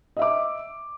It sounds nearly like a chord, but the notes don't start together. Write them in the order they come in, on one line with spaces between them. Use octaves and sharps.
D#5 E5 D6